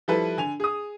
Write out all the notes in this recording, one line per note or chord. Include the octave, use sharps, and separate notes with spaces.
F3 G3 E4 A4 B4
D3 G#5 F7
G#4 D#6